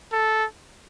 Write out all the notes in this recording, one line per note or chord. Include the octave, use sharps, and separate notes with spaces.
A4